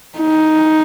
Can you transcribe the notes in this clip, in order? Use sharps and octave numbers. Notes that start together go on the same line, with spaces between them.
D#4